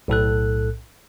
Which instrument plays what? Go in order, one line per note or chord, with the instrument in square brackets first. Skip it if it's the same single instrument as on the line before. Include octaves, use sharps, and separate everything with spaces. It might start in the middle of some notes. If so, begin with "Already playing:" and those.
[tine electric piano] B1 A2 A4 F#6